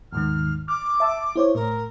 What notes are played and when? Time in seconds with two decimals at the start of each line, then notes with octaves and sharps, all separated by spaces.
0.13 D#2 G#2 D#3 F6
0.68 D6 F6
1.00 E5 A5 E6
1.36 E4 C5 C#5
1.55 A2 A#4